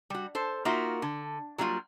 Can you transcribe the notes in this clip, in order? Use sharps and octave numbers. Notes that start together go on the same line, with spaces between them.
G3 F#4
A4 C5
A#3 D#4 F4 F#4 A#4 E5
D3
F#3 G3 A#3 D#4 F4